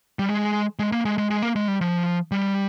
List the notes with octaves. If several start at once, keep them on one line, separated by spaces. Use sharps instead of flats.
G3
G#3
G#3
A#3
G#3
G#3
G#3
A#3
G#3
G3
F3
G3